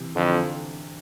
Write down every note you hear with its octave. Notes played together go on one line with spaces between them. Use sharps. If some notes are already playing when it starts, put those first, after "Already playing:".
Already playing: C3 E3
F2 D3